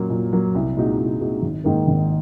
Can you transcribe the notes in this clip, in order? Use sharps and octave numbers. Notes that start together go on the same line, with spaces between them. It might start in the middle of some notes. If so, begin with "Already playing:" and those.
Already playing: A#2 F#3 A#3
A#2
F#3 A#3
C2
A#2 G#3 D#4 F#4
C2
A#2 G#3 D#4 F#4
G#1
G#2 D#3 A#3
G#1